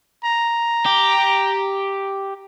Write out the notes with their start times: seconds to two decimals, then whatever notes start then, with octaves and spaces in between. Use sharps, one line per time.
0.24 A#5
0.86 G4